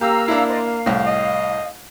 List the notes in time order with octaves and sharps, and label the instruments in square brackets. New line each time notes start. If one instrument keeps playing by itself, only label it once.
[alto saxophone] A#3 [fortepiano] G4 [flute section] F5 A#5 E6
[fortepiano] D4 E4
[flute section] C5 D5 D#5
F5
[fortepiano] C2 A2
[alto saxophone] D#5